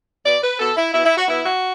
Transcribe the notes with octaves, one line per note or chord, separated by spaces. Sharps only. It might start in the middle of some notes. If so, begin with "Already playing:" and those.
B2 B3 D5
B4
B2 B3 A4
E4
B2 B3 E4
E4
F#4
B2 B3 E4
F#4